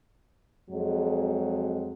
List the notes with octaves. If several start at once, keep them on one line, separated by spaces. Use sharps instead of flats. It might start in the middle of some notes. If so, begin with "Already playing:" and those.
F2 F#3 G#3